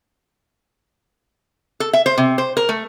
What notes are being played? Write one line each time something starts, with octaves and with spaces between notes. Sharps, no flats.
A4
E5
C5
C3
C5
A#4
A3